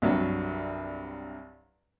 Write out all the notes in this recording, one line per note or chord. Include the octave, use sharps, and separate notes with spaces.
C2 G2 F#3